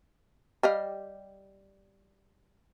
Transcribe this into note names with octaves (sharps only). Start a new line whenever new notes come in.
G3 D#5 F5